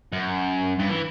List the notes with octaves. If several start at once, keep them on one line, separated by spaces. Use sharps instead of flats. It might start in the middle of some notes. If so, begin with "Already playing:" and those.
F#2
G2
E3